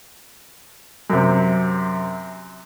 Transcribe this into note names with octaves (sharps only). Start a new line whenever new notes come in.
F#2 C3